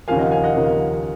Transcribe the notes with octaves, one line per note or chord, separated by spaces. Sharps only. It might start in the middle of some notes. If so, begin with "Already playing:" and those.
D#2 C#3 F3 A#3 F5 G#5
D#5 F#5
F5 G#5
D#5 F#5
D#2 C#3 F3 A#3